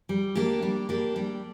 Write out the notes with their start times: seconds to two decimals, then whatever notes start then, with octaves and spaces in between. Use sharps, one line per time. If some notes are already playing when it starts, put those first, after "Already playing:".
0.09 G3
0.35 A#3 D4 G4
0.62 G3
0.89 A#3 D4 G4
1.16 G3